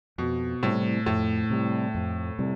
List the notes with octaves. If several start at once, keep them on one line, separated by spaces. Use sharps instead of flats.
F2 B2
A2 C3 G3
F2 A2
C3 G3
F2
C3 G3